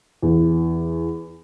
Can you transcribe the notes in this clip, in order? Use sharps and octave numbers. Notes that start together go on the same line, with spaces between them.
E2